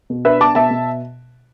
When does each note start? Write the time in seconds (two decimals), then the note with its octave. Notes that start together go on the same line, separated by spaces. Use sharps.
0.10 B2
0.25 D4 B4 E5
0.41 B3 A5 D6
0.55 B2 E5 A5
0.70 B2